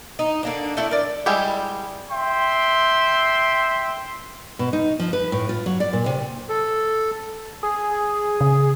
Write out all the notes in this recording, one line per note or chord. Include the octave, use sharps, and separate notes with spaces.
D#4
D3 A#3 D4
A3 D4 E4 E5
A#4 D5
G3 G#3 E4 G4
E5 G5 C6
B2
D#4
F3
B4
A2
F4
F#3
D5
A#2
C3
A4
G#4
C#3